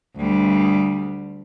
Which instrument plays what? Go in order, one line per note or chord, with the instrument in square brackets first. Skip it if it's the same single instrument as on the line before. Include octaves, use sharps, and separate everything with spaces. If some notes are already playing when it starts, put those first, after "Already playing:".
[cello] D2 G3